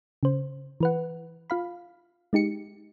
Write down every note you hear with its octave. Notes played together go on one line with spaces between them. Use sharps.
C#3 C5
E3 B4 F#5
F4 F5 B5
G#3 D#4 G4 C#7